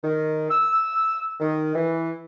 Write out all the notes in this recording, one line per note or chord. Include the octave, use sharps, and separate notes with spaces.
D#3
E6
D#3
E3